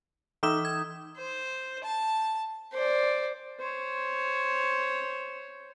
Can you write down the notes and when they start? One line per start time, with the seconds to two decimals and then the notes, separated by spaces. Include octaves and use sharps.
0.43 E3 D#4 E5 D6 E7
0.65 G#6
1.17 C5
1.84 A5
2.74 C5 D5
3.59 C5 C#5